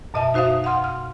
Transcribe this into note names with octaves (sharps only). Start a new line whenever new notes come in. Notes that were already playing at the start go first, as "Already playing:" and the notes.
F#2 B2 D#5 E5 A5
D#4 F#4 C5 E5 F5 D#6
F5 F#5 C6 F6
F6